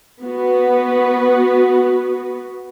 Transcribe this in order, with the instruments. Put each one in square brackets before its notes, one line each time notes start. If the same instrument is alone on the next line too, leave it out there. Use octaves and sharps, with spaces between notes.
[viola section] B3 F#4 B4